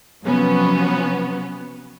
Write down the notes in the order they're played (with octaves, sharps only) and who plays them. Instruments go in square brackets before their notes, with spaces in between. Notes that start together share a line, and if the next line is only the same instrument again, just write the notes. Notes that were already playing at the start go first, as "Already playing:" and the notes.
[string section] C3 F3 F#3 B3 C#4